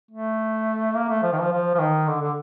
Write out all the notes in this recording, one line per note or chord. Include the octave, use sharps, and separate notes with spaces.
A3
A#3
A3
F3
D#3
F3
F3
F3
D#3
D3
D3